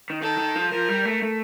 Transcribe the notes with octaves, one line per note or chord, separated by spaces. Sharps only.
D#3
D#3 A4
D#3
F3
F3 A#4
G3
A3
A3